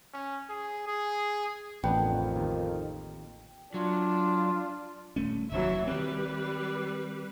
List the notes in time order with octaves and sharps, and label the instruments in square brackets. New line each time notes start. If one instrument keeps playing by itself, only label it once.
[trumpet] C#4
G#4
G#4
[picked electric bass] A1 [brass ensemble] F2 D#3 [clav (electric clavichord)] B3 D4 B4 [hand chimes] G5
[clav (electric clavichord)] D#2
[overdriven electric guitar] F#3 [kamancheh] D4 [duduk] F4
[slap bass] D#1 A3 C#4
[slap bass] F1 D#2 [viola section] E3 F#3 E5
[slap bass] D#3 C4 [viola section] G3 B4